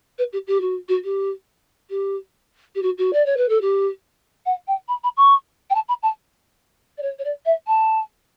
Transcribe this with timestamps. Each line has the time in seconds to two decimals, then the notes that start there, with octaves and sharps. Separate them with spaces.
0.18 B4
0.33 G4
0.47 G4
0.60 F#4
0.88 F#4
1.04 G4
1.90 G4
2.75 G4
2.82 F#4
2.98 F#4
3.13 D5
3.25 C#5
3.37 B4
3.49 A4
3.61 G4
4.46 F#5
4.67 G5
4.88 B5
5.03 B5
5.17 C#6
5.70 G5
5.75 A5
5.88 B5
6.02 A5
6.98 D5
7.02 C#5
7.18 C#5
7.24 D5
7.45 E5
7.67 A5